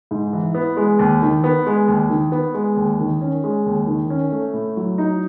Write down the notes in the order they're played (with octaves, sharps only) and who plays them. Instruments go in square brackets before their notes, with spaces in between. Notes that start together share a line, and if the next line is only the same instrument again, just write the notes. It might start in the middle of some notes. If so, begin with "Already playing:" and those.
[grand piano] G#2
E3
B3
G#3
D#2
D#3
B3
G#3
D#2
D#3
B3
G#3
D#2
D#3
C#4
G#3
D#2
D#3
C#4
A3
A2
F#3
D#4